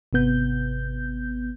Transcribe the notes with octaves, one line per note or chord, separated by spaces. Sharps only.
G#1 C3 B3 G6